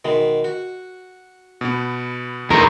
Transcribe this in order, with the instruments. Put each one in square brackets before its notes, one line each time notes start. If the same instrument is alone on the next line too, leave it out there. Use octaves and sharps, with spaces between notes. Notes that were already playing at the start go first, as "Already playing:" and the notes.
[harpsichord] B2 D#3 G#3
F#4
[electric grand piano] B2 B3
[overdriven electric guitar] E2 D#3 [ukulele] A#4